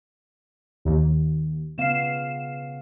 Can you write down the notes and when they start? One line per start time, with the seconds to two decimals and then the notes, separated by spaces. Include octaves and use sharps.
0.85 D#2
1.78 C#3 B3 F5 C7 E7